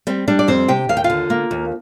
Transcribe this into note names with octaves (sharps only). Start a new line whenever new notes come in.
G3 C4
G3 D4
D5
F2 C4 C5
C3 G4 G5
D#2 F5
G5
F4 F5
D3
A#3
D#2